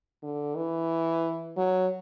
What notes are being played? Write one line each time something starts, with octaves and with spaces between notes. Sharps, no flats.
D3
E3
F#3